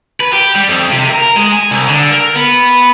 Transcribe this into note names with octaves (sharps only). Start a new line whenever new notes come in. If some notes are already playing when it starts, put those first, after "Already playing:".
B4
G4
G3
F2
C3
A#4
G#3
G#5
C2
D3
A#4
B3